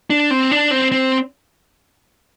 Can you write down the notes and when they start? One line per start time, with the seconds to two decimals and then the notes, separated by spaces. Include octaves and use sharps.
0.10 D4
0.31 C4
0.51 D4
0.71 C4
0.92 C4